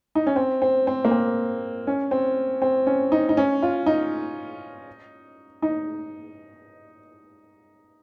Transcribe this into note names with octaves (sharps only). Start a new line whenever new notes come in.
D#4
C#4
C4
C4
C4
A#3
C4
C#4
C4
C4
C#4
D#4
D#4
C#4
F4
D#4
D#4